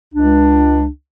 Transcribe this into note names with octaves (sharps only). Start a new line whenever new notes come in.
C#2 D4